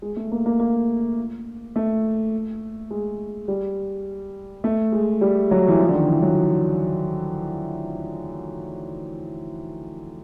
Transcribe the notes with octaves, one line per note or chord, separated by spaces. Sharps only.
G#3
A3
A#3
A#3
A#3
A3
G#3
G3
A3
G#3
G3
F#3
E3
F3
D3
D#3
E3
F#3